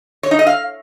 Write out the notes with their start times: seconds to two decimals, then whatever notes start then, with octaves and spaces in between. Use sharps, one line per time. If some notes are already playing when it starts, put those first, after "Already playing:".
0.23 C#5
0.31 D#4
0.39 D#5
0.47 F5